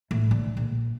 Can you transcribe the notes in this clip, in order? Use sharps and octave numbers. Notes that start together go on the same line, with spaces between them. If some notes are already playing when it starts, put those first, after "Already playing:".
A2
D3
A#1